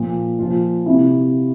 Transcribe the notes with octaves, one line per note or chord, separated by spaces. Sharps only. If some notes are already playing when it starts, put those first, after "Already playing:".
Already playing: A#2 F3
A#2 F3 F4
C3 E4